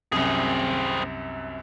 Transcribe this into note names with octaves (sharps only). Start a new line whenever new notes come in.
C2 F#2 C4 G#4